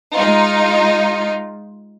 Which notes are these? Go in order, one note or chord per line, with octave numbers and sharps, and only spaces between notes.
G#3 D#4 F4